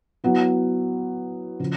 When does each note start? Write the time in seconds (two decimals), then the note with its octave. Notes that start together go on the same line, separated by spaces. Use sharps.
0.24 F#3 B3 E4
1.60 C#3 F3